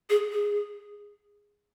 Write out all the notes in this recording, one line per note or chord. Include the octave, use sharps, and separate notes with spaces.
G#4
G#4